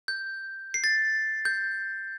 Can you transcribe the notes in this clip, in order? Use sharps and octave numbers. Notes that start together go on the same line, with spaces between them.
G6
C7
A6
G6